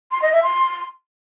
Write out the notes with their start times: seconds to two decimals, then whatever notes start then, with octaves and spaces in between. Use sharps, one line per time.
0.12 C6
0.22 D#5
0.33 E5
0.43 C6